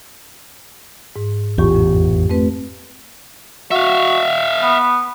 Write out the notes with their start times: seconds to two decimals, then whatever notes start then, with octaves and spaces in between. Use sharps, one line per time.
1.16 G#2
1.58 A1 E2 F4 G4 C#6
1.75 F2
2.30 A3 C4 B4
3.71 F#4 E5 F5
4.62 B3